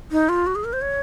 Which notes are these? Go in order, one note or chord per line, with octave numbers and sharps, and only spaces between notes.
D#4
F4
F#4
G#4
A#4
C5
C#5